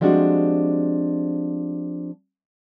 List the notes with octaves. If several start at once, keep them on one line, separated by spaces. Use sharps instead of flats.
F3 G3 G#3 C4 D4 F#4